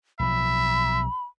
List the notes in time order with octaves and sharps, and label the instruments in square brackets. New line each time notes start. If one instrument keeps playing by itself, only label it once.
[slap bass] B1 F3 [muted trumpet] E5 [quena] B5